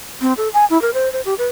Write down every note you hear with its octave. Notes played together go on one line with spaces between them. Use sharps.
C4
A4
G#5
E4
A#4
C5
C5
G4
B4